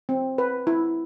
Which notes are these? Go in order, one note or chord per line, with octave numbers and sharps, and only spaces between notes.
C4
B4
E4